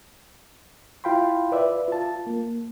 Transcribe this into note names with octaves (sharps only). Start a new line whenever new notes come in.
E4 F4 F5 G5 B5 C6
B4 D5 E5
F4 A5
A#3